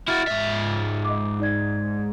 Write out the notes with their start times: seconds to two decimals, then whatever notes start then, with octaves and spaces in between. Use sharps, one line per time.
0.08 E4 F#4 F6 A6
0.27 G#2 E5
1.05 D#5 D6
1.40 D#4 D5 G#6